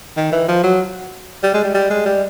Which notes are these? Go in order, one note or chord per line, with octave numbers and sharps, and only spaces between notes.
D#3
E3
F3
F#3
G3
G#3
G3
G3
G#3
G3